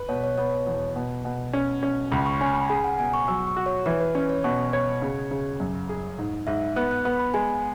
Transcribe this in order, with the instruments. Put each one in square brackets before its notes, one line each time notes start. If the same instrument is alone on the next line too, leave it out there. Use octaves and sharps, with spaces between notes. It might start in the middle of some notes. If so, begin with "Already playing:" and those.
Already playing: [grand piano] B4
[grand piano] B2 [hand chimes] C#5
[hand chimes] C#5
[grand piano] B3 [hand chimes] C#5
[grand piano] E2
B2
B2
C#4
C#4
[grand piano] C#2 [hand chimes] B5
[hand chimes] C#6
[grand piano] C#4 [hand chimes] G#5
[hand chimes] B5
[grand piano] G#4 [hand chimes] G#5
[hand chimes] F#5
[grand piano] B2 [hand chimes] G#5
[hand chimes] C#6
[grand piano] F#3 [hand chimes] E6
[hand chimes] C#6
[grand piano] F#4
[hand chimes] C#5
[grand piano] E3 [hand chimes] B4
[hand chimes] B4
[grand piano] C#4 [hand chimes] C#5
[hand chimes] C#5
[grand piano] B2 [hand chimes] C#6
[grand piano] C#5
C#3
C#3
F#2
G#4
G#2
[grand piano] G#2 [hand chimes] E5
[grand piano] B3 [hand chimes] F#6
[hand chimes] F#6
[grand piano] B3 [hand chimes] B5
[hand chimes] B5
[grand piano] G#3 [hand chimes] G#5